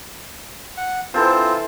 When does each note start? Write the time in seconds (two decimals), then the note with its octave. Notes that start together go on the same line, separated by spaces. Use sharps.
0.77 F#5
1.14 E3 C4 F4 A4 C5